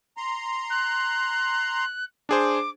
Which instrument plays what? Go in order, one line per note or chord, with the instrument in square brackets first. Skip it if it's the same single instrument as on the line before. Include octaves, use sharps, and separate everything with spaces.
[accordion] A#5 C6
[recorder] F#6
[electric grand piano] D4 G#4 C5 [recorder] D6